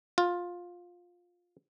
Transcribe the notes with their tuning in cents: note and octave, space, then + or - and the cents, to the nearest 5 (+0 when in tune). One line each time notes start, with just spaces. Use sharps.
F4 +15